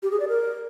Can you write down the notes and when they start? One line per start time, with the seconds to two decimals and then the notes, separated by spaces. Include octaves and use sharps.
0.03 G4
0.11 G#4
0.20 D5
0.28 A#4